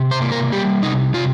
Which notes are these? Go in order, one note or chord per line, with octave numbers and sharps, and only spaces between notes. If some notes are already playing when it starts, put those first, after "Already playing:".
Already playing: C3
C5
A#3
A#4
G3 G4
C3 D#4
C3 F4